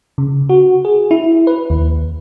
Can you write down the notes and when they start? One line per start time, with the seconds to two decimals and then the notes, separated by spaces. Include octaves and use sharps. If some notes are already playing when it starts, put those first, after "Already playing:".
0.18 C#3
0.49 F#4
0.85 G#4
1.11 E4
1.47 B4
1.70 D#2